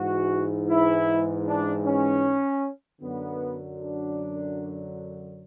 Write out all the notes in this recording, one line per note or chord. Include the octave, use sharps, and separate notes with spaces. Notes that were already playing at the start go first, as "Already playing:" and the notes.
Already playing: G#2 E3 F#4
E4
D4
C#4
F#2 D3 F#3 B3
D4